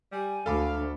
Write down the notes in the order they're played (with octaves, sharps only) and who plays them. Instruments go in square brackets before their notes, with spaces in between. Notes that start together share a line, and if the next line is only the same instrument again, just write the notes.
[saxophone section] G3 [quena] G#5
[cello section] D2 [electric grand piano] A4 B5 D6 [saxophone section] F5